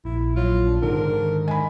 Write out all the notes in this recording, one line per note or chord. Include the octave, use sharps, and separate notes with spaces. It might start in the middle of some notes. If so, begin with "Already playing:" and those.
A#1 E4
F#3 F4
D4
G#2 D3 D#3 A#4
D#3
G#3 G#5 B5